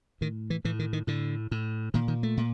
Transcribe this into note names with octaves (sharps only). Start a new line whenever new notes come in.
A2 D#3
E3
A2 E3
D#3
D#3
A2 D3
A2
A#2 D#3
D#3
A3
A#2